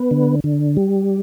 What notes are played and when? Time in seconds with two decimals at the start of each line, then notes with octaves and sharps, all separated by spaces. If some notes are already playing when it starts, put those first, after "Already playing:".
Already playing: B3
0.11 D3
0.44 D3
0.77 G3